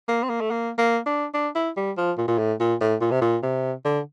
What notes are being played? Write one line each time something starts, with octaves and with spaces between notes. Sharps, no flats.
A#3
C4
A#3
A3
A#3
A#3
D4
D4
E4
G3
F3
A#2
A#2
A2
A#2
A2
A#2
C3
A#2
C3
D3